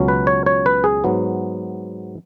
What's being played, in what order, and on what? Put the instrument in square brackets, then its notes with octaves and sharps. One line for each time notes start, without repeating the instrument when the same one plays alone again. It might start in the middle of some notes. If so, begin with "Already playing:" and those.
Already playing: [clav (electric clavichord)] C#2 B2 F#3 C#4
B4
C#5
C#5
B4
G#4
G#2 F#3 B3